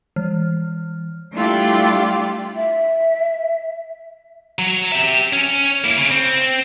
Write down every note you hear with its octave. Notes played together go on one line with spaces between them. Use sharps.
E3 F6
G3 A3 D4 E4 F4 G4
E5
F#3
G4 E5
C#4
A#3 E4
C#3
C4